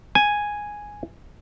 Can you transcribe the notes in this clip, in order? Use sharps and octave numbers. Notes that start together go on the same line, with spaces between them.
G#5